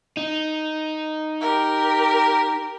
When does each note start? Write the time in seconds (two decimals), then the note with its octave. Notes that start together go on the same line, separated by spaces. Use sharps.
0.17 D#4
1.41 G4 A#4